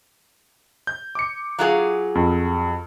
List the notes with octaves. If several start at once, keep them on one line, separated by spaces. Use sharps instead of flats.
G6
D6 C#7
F#3 F4 G#4
F2